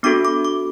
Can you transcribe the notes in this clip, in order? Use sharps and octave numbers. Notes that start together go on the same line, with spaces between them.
B3 D4 F#4 A4 D6
D6
D6